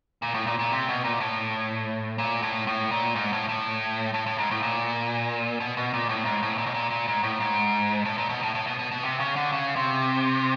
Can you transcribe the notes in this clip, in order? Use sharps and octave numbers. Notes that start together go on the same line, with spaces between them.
A#2
A2
A#2
A#2
C3
B2
A#2
A2
A#2
A2
A2
A#2
G#2
A2
A2
A2
A2
G#2
A2
A#2
B2
B2
A#2
A2
G#2
A2
A#2
B2
A#2
A#2
G#2
A2
G#2
A2
A#2
B2
A2
A2
B2
B2
B2
C3
C#3
D3
C#3
C3